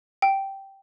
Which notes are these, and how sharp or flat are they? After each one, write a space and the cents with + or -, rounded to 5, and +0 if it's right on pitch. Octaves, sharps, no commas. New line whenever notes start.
G5 -10